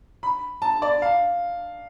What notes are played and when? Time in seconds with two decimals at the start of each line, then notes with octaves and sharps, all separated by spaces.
0.23 B5
0.62 A5
0.82 D5
1.02 F5